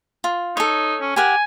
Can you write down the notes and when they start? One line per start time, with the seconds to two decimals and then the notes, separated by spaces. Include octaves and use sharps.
0.24 F4
0.57 D#4 A4 C#5
1.01 C#4
1.16 G4 A#4 F#5 G#5